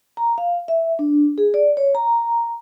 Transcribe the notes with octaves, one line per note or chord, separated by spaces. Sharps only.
A#5
F5
E5
D4
G#4
D5
C#5
A#5